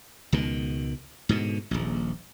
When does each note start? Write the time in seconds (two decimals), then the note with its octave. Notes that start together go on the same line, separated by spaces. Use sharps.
0.32 C#2 B2 D#3
1.29 G#2 B2 D3
1.71 D#1 A#1